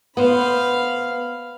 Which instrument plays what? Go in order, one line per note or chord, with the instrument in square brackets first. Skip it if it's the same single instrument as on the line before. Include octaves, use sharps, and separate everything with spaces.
[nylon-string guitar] B3 C5 [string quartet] F5 B5